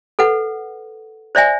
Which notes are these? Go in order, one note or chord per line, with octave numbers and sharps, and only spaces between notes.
A4 B4 F#5
C5 D5 E5 G#5